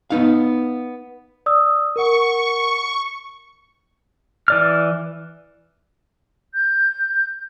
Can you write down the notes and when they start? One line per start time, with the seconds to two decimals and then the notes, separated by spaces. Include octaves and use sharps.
0.10 B3 D#4 F5
1.46 D5 D#6 E6
1.96 A#4 F#5 C#6
4.48 E3 D5 F6
6.53 G6